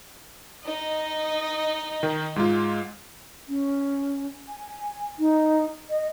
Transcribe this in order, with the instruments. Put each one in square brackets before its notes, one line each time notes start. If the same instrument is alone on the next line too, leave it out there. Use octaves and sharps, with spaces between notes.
[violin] D#4 D#5
[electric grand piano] D#3
G#2 G#3 F4
[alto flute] C#4
G#5
D#4
D#5